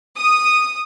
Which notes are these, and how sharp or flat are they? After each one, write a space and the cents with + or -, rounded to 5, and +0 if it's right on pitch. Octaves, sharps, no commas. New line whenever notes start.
D#6 -10